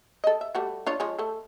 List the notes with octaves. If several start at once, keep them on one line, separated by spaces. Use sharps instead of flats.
A4 D#5
E5
G3 A3 F#4
D4 F4 C#5
F3 G#3 C#4
A3 A4